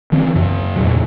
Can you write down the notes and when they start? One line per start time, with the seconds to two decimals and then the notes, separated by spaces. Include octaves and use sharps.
0.12 D#3 E3 C4
0.35 F#2 C#3
0.76 E2 A#2 C#3 F#3